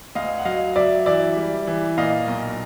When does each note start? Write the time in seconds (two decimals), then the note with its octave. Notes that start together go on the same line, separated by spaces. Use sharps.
0.15 D2 D#5 F5
0.38 F#5
0.45 F#3 D#5 F5
0.76 F#3 D5 E5
1.06 E3 D5 E5
1.36 G3
1.67 E3
1.98 A#2 D#5 F5
2.27 B1